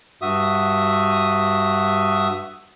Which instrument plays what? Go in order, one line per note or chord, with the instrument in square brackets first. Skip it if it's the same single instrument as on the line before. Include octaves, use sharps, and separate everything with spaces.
[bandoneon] G2 F#4 E5 D#6